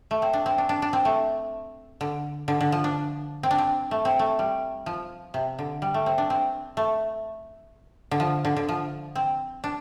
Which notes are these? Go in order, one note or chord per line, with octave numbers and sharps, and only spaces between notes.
A3
C4
D4
C4
D4
D4
D4
C4
A3
D3
D3
D3
F3
D4
C4
D4
C4
A3
C4
A3
G3
F3
C3
D3
G3
A3
C4
D4
C4
A3
D3
F3
D3
D3
F3
C4
D4